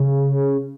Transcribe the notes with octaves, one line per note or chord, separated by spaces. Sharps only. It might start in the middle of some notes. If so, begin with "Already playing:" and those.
Already playing: C#3